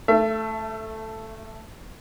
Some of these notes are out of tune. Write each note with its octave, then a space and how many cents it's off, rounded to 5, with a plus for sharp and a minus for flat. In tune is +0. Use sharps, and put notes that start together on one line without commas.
A3 +0 E5 +35